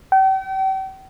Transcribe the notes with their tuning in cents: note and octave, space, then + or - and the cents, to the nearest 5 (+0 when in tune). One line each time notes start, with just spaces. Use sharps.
G5 -40